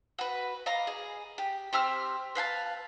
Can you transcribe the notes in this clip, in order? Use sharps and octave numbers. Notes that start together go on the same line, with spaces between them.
F#4 B4
D#5 F5 A#5 D6
G#4
G4
C4 G4 E6 F6
B4 F5 G5 A5